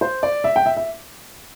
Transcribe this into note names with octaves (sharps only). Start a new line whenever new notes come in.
C5
D5
E5
G5
E5
E5